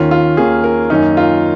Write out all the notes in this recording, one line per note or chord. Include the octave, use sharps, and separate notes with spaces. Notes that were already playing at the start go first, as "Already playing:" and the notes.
Already playing: D#2 D#3 A#3 C#4 F4
F4
D#2 D#3 A#3 C#4 G#4
A#4
F#2 D#3 A#3 C#4 D#4
F4